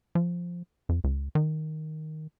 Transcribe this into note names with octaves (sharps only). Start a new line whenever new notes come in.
F3
F2
C#2
D#3